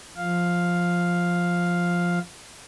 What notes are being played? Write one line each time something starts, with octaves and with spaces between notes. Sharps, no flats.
F3 F5